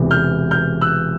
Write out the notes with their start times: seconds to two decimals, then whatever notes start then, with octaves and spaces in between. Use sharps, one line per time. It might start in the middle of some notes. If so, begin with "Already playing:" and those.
Already playing: E1 E2 C3
0.11 F6 G6
0.51 F6 G6
0.81 E6 F#6